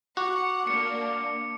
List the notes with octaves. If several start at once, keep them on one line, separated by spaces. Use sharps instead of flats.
F#4 F#5 D6
A#3 D4 C#7